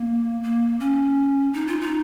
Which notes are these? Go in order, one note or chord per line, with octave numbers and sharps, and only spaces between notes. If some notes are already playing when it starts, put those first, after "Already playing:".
Already playing: A#3
A#3
C#4
D#4
F4
D#4